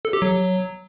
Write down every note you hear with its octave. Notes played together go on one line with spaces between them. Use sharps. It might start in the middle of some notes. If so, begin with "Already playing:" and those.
A4
G4
F#3